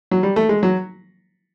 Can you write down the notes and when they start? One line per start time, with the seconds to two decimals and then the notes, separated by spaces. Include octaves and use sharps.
0.11 F#3
0.23 G3
0.36 A3
0.49 G#3
0.63 F#3